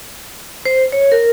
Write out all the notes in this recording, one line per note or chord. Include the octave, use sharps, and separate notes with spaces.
C5
C#5
A#4